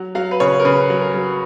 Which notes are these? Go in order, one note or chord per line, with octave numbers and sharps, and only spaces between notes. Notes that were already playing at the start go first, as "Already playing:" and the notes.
Already playing: F#3
F#3 F5
B4
C#3 C#5
A#4
C#3 B4
F#3
A#4
F#3